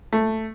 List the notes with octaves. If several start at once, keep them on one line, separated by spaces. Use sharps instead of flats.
A3